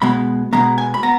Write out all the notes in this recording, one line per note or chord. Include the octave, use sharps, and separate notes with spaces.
B2 G#3 B3 B5
B2 G#3 B3 A#5
G#5
B5
B3 A#5